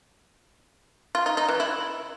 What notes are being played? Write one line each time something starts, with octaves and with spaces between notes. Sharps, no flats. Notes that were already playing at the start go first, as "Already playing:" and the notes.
F4
D#4
D#4
E3
E4